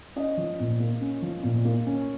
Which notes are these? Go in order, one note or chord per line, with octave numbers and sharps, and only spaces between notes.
C#4 D#5
F3
A#2
A#3
C#4
F3
A#2
A#3
C#4